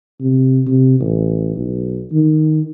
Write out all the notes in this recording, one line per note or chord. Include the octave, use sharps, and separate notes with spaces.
C3
C3
A1
B1
D#3